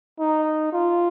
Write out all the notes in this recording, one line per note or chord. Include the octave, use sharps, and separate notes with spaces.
D#4
F4